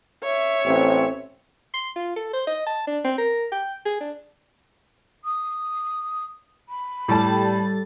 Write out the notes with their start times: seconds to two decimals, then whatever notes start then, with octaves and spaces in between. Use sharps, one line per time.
0.24 C#5 E5
0.66 A1 C4
1.74 C6
1.96 F4
2.16 A4
2.33 C5
2.47 D#5
2.67 A5
2.87 D4
3.04 C4
3.18 A#4
3.52 G5
3.86 G#4
4.01 D4
5.24 D#6
6.68 B5
7.08 A2 G3 A4 A5 A6